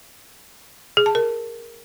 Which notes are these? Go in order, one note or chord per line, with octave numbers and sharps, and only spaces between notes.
G#4
A5
A#4